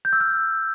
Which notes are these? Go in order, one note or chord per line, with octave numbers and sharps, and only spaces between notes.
G6
E6
F6